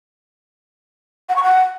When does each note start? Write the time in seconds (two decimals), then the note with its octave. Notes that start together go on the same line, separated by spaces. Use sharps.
1.29 F#5
1.36 C#6
1.43 F#5